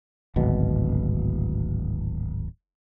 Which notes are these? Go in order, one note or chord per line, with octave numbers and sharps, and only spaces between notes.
D1 G#1 B2